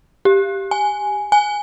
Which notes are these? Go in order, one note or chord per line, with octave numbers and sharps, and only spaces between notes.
G4
G#5
G#5